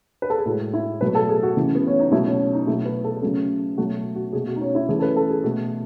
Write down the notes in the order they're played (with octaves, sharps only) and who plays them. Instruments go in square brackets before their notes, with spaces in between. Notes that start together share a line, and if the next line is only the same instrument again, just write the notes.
[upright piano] B4
A4
G#4
A2 F#4
G#3
E4
B2 F#3 A3 B4
A4
G#4
F#4
C#3 E3 A3
B3
C#4
D#4
B2 F#3 A3 E4
C#4
C#4
D#4
B2 F#3 A3 E4
B4
A4
A4
C#3 F#3 A3 G#4
B2 F#3 A3 F#4
F#4
B2 A3 G#4
F#4
D#4
C#4
E4
C#3 E3 A3 G#4
A4
B4
A4
G#4
B2 A3